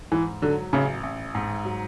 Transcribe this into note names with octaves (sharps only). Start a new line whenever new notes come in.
G#2 E3
D3 F#3
A1 C#3
A1
G#2
F#3